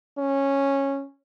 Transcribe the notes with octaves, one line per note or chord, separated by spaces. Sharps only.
C#4